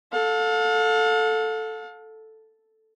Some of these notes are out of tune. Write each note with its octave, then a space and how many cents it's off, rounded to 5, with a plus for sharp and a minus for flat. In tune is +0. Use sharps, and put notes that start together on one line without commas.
A4 +0 F5 +40